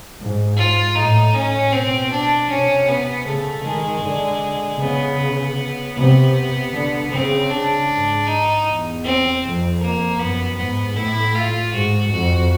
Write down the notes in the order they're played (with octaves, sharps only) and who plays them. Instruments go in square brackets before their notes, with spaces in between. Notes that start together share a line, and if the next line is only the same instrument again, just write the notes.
[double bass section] G#2
[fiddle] F4
[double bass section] A2 [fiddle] D#4
[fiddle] C#4
[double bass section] B2 [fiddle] C4
[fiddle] D4
[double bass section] C3 [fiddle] C#4
[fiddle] B3
[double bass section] C#3 [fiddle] A3
[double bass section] D#3 [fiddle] G#3
[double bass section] D3
[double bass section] C#3 [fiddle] B3
[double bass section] C3 [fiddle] B3
[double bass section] D3
[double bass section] C#3 [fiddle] C4
[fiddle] D4
[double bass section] G#2
[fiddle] D#4
[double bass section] E2
[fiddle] C4
[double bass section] F2
[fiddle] A#3
[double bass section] F#2 [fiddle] B3
[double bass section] G#2 [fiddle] B3
[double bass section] A2 [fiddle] E4
[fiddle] F4
[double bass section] G#2 [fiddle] F#4
[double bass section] F2 [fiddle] F#4